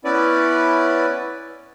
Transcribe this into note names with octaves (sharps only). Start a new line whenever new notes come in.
B3 C#4 E4 B4 D5